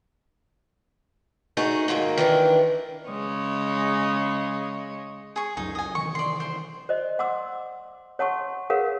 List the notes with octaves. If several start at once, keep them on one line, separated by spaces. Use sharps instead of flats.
A3 D#4 F#4 G#4
G#2 D#3 F#3 A#3
D#3 E3 D4
C#3 G#3 C#5
G#4 C#6
C#2 F#2 F#3 D#4
D#5 G#5
C3 D#3 E3 C#6
D5 C6
C5
C5 D5 D#5
F#5 C6 D6 E6
C#5 F#5 A5 C6 C#6
G#4 A#4 B4 C#5 F5 F#5